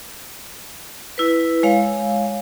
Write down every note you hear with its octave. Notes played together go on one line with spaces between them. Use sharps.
E4 B4
G#3 C#5 F5